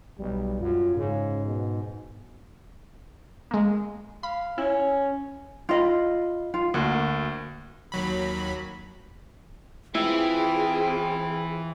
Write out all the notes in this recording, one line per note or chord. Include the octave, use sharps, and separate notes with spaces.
B1 G3
F#2 F4
G#2 C#3
B2
G#3 A#3
F5 B5
C#4 E4
F4 D#5 B5
F4
D2 A#3 F#4
D#2 F#3 B5
E3 C4 E4 F4 G#4 G5